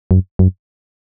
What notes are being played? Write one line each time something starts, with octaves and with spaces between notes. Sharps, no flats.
F#2
F#2